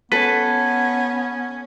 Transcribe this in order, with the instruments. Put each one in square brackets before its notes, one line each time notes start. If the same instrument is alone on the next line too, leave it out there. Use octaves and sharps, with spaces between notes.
[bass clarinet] B3 [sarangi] C#4 [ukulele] A4 [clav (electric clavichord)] B4